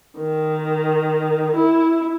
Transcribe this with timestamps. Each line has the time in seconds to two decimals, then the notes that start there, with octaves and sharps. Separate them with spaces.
0.18 D#3
1.55 E4